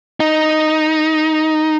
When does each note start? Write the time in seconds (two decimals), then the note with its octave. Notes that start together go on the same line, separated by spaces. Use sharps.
0.20 D#4